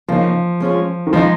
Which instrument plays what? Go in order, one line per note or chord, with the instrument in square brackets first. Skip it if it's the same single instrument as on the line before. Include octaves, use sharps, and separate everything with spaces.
[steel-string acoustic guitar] C#3 A#3 D#4 [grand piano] F3
[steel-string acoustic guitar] G#3 C#4 F4 G#4
[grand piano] D#3
[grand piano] F3 [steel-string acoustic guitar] G#3 D#4 G#4